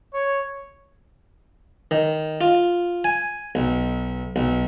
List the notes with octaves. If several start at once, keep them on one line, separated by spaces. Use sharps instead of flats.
C#5
D#3
F4
G#5
B1
B1